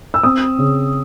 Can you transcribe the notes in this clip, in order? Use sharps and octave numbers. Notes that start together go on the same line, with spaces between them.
E6
C4 D#6
C#3